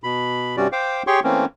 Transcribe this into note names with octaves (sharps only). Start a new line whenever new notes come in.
B2 B5
G2 C3 G3 C#4 F#4 D5
C5 F5 G5 D6
G4 G#4 C#5 G5 C6 C#6
E3 A3 A#3 C4 C#4